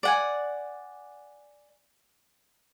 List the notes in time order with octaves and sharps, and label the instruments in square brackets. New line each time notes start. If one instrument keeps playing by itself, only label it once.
[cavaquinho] D5 F#5 G#5